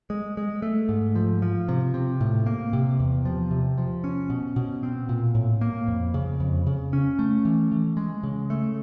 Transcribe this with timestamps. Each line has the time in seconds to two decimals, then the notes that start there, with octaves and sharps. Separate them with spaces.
0.10 G#3
0.37 G#3
0.62 A3
0.89 G#2
1.16 F3
1.42 F3
1.68 C3
1.94 C3
2.21 A2
2.46 A#3
2.73 C3
2.99 E2
3.25 F3
3.51 C3
3.78 F3
4.04 C#4
4.30 B2
4.56 B2
4.83 C4
5.09 A#2
5.35 A2
5.61 A#3
5.88 F2
6.14 C#3
6.40 F2
6.67 C#3
6.93 C#4
7.19 A3
7.45 E3
7.72 E3
7.97 G#3
8.23 C#3
8.50 A3